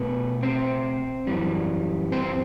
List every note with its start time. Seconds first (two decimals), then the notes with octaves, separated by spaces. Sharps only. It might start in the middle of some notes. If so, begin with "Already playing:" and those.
Already playing: B2 A3 B3 B4
0.43 C4 C5
1.27 F#2 E3 G3
2.12 C4 C5